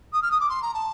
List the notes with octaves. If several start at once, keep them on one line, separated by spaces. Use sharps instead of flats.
D#6
F6
D#6
D6
C6
A#5
A5